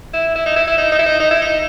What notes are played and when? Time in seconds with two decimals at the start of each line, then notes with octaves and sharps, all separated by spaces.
0.14 E4
0.36 E4
0.46 D#4
0.56 E4
0.67 E4
0.78 D#4
0.92 D#4
0.99 E4
1.06 D#4
1.20 D#4
1.31 E4
1.42 D#4